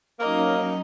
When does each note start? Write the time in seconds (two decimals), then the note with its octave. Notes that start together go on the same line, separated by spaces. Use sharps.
0.20 F#3 A#3 C#4 D#4 D#5 A#5